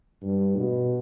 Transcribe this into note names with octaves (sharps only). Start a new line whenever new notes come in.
G2
B2